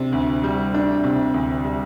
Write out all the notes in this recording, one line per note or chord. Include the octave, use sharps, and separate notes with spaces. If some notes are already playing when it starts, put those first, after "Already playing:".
Already playing: C3 D4
D2
G3
D4
C3
D2
G3